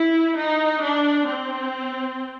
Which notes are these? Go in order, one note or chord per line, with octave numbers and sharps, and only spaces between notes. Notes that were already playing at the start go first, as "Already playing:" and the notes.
Already playing: E4
D#4
D4
C4